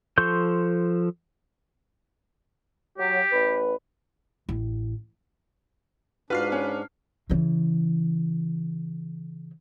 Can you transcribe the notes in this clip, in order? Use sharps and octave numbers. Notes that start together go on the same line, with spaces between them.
F3 A4 C6 C#6 G6
F#3 G4
A1 B4
A1
G#2 D4 F4 F#4 B4 F5 F6 C7
C#4
C#3 E3